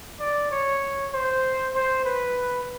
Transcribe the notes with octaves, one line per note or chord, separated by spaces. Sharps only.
D5
C#5
C5
C5
B4